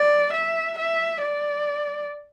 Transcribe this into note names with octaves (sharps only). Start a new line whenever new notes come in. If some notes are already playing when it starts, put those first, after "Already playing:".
Already playing: D5
E5
E5
D5